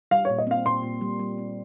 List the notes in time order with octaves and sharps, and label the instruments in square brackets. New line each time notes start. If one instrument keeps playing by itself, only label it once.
[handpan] G3 [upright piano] F5
[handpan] A#2 [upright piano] C#5
[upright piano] D#5
[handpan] C4 [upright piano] F5
[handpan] A#2 [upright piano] C6
[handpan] A#2
G3
G3
C4